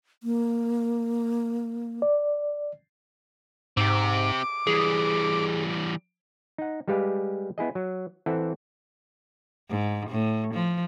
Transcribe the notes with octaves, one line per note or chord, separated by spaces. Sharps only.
A#3
D5
G#2 C4 G4 D6
E3 G3 G#4
D#4 F#5
G3 G#3 G4 B4 F5
B3 E4 G#4 D#5
F#3
E3 C4 A4 E5 F#5
G#2
A2
F3